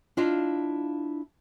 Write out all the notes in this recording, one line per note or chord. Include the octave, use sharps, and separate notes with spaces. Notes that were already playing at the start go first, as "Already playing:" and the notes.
D4 E4 F4 D#5 F5